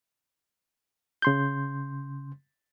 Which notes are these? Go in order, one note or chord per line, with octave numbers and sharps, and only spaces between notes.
C#3 C6 G6